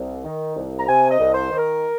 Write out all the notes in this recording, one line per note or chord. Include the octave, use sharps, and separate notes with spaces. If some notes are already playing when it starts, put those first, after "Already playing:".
Already playing: C2
D#3
C2
A#5
C3 G#5
D#5
C2
C5
D#3
A#4